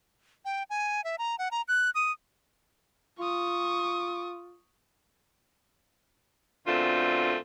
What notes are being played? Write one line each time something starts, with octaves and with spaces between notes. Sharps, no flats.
G5
G#5
E5
A#5
F#5
A#5
F#6
D#6
F4 C#6 D#6
F#2 B2 D3 A3 C4 F4